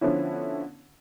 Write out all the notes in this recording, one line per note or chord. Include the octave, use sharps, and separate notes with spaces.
D3 F3 B3 C#4 E4